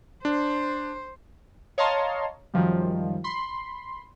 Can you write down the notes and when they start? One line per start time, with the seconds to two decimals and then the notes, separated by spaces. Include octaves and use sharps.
0.25 D4 C5
1.78 C#5 D#5 F5 A5 A#5 C6
2.54 F#2 D#3 F3 G3
3.24 B5 C6